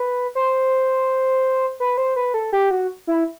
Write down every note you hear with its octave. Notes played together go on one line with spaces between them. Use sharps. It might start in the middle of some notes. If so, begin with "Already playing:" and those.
Already playing: B4
C5
B4
C5
B4
A4
G4
F#4
E4